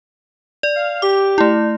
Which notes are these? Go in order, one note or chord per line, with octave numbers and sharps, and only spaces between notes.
D5
F5
G4 D6
A3 E4